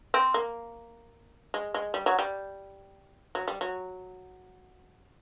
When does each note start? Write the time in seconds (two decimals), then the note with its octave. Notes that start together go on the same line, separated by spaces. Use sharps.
0.14 C4
0.34 A#3
1.54 G#3
1.74 G#3
1.94 G3
2.06 F#3
2.19 G3
3.35 F#3
3.48 G3
3.61 F#3